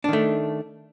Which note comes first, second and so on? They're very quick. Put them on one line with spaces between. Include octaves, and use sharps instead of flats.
D4 D#3 A3